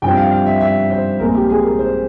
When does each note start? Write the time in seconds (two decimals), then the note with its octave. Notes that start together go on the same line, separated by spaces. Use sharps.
0.02 G2 F3 C4 G5
0.17 F5
0.31 F5
0.46 E5
0.60 E5
0.91 C5
1.19 A#1 A#2 G#3 C4 A#4
1.35 G4
1.50 G#4
1.64 A#4
1.79 C5